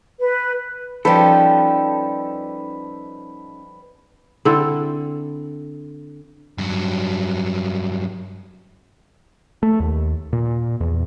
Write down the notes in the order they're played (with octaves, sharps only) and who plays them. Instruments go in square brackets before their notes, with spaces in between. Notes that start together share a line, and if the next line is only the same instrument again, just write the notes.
[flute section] B4
[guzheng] F3 G3 [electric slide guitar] C#4 D#4 A4 [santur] B4
[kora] D3 C4 E4 A4
[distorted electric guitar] G2 F#3
[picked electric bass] A3
D#2
A#2
E2